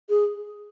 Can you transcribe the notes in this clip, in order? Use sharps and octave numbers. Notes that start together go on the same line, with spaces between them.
G#4